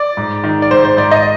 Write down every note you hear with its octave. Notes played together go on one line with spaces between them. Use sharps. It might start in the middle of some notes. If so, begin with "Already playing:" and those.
Already playing: D5
G#2
D#3
D5
G#2 C5
C5
G#2 D5
D#5